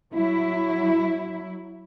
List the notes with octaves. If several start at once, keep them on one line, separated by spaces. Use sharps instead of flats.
F#3 E4